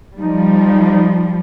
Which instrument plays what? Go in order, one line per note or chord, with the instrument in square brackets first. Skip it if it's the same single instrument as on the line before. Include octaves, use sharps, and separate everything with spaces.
[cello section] F3 G3 [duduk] D#4